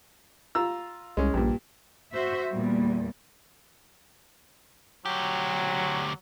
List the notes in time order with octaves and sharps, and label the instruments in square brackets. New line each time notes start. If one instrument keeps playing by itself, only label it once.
[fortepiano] F4 A#5 E6
[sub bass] C2 [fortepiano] G#3 C#4
[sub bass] A#1 [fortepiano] G2 A#2
[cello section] F#4 C5 E5
E2 A#2 G3
[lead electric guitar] D2 G4 [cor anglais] F#3